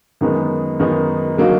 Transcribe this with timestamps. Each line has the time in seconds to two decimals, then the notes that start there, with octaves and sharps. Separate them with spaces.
0.21 F#2 D#3 G#3 B3 D#4
0.79 F#2 D#3 G#3 B3 D#4
1.37 D3 F#3 A#3 D#4 F#4